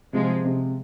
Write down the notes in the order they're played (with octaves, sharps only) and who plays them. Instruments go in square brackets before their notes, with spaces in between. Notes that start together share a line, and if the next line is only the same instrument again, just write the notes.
[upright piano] C3 [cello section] F3 G#3
[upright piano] C3